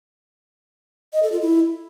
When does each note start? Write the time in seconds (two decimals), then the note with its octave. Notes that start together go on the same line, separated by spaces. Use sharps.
1.13 D#5
1.23 A4
1.32 F4
1.42 E4